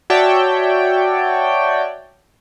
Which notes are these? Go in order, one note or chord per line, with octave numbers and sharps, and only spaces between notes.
F#4 C#5 D5 E5 G5 A5